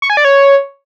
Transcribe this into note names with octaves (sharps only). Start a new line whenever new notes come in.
C#6
G#5
D5
C#5